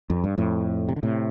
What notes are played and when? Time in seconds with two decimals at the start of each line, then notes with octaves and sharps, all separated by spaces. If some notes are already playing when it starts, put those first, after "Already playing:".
0.10 F2
0.24 G2
0.38 F2 A2
0.88 C3
0.96 D3
1.03 A2 C3